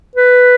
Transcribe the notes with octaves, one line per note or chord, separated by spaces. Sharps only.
B4